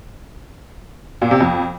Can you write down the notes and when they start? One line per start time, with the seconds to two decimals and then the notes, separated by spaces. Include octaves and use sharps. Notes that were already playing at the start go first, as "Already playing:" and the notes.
1.22 A#2
1.31 C3
1.40 F2